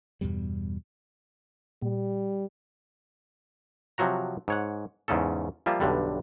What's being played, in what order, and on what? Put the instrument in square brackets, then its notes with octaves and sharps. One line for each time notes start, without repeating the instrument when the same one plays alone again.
[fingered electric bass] E2 G2 B2 G3
[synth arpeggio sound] A#2 [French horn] G3
[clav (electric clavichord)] C3 F3 F#3 F#4 A#5
G#2 C#5 F#5
E2 G#2 C#3 C#4 A4
F3 G3 A#3 F4 E5
B1 G2 D3 G3